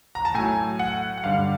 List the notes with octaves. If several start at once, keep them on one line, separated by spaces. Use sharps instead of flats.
A#5
A5
A2 F#3 G#5
F#5
F#5
G2 D3 G3 F5